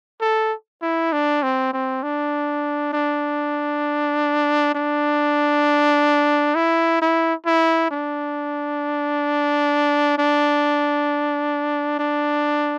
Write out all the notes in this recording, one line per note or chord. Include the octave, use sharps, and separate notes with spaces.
A4
E4
D4
C4
C4
D4
D4
D4
E4
E4
E4
D4
D4
D4